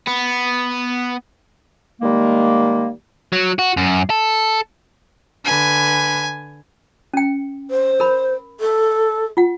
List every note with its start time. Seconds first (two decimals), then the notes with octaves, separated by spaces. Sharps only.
0.07 B3
2.00 D#3 G3 G#3 A#3
3.33 F#3
3.59 F#4
3.77 F#2
4.10 A4
5.45 D3 B4 G#5
7.14 C#4 G5
7.70 C5
8.00 A#4 B5
8.60 A4
9.37 F4 F#5